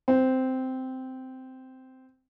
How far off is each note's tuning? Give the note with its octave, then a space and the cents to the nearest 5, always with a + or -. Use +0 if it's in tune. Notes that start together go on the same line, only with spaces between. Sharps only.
C4 -10